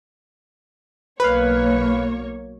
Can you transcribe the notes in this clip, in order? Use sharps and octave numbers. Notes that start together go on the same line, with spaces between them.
B1 A#3 B4 C#5 F5